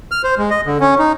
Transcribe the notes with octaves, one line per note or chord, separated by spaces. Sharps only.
F6
C5
G#3
D#5
D3
C#4
D#4